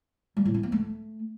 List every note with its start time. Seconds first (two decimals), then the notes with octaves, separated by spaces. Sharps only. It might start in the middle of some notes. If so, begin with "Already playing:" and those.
0.37 G3
0.45 A2
0.54 C#4
0.63 B3
0.72 A3